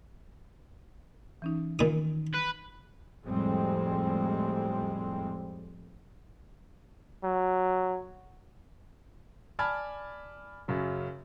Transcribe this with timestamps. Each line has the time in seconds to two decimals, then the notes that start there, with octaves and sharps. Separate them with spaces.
1.42 E3 C#4 D#4
1.79 A#2 D#3 D#6
2.35 B4
3.25 F2 A2 G3 G#3 C4
7.24 F#3
9.59 D5 G#5 A5 B5 F6 G#6
10.68 F#2 C#3 F#3